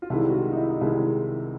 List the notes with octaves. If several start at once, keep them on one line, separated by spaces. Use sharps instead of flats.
F4
C2 C3 D#3 G#3 E4
F#4
F4
D#4
E4
D#4
C2 C3 D#3 G#3 E4